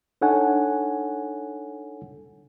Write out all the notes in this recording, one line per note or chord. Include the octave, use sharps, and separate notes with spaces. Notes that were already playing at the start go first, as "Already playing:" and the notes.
D4 D#4 A4 C#5 F#5 G#5